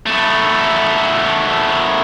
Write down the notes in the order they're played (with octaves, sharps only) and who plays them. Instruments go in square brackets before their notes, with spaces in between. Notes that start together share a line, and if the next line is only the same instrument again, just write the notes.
[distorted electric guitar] A3 B3